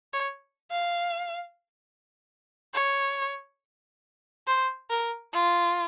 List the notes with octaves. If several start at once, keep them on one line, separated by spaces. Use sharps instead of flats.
C#5
F5
C#5
C5
A#4
F4